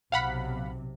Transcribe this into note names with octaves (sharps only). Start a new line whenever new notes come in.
B1 C3 F5 F#5 B5